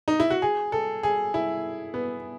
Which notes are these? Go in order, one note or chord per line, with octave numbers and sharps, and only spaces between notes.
D#4
E4
F#4
G#4
A4
G#4
E4
B3